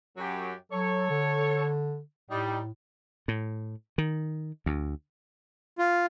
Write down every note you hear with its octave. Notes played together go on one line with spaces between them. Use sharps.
F#2 F#3 G4
F#3 A4 C#5
D3
A2 G3 D#4
A2
D#3
D2
F4